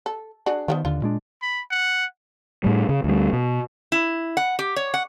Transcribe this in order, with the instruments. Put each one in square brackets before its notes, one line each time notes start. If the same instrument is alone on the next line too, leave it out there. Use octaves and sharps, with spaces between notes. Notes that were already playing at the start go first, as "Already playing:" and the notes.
[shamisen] A4
D4 F#4 G#4
[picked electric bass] D#3 [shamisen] F3 A3 B3
[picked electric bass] D#2 D3 [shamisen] F4
[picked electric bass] A#2 G#3 D4
[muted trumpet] B5
F#5
[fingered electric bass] A2 G3
C#3
D2 G3
B2
[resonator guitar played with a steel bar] E4
F#5
G4
C#5
F#5